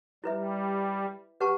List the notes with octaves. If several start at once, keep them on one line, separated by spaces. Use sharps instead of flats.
G3 E4 B4 E5
G4 B4 F#5 A5 C#6